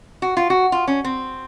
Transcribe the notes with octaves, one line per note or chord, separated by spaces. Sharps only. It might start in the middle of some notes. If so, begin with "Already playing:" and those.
F#4
F4
F#4
F4
C#4
C4